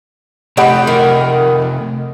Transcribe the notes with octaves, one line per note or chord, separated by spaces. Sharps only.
C3 G3 A3 D#5 F#5 B5
D#3